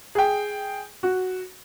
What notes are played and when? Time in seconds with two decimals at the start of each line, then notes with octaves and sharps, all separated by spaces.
0.15 G#4 G5
1.03 F#4